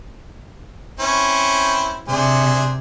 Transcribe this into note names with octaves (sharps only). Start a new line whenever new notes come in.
C4 C#4 E4
C3 D4 G#4 C5